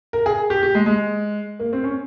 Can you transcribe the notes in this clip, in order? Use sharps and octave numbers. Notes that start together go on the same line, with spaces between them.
A#4
G#4
G4
G4
G#3
G#3
A#3
C4
C#4